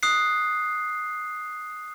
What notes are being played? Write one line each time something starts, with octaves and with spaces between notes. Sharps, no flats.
D#6 F#6 C7